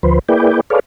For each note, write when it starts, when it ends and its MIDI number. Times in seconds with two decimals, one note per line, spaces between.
0.03 0.19 38
0.03 0.19 53
0.03 0.19 71
0.03 0.19 72
0.29 0.61 58
0.29 0.61 64
0.29 0.61 68
0.29 0.61 71
0.29 0.61 74
0.29 0.61 79
0.70 0.79 68
0.70 0.79 69
0.70 0.79 71
0.70 0.79 73
0.70 0.79 74
0.70 0.79 77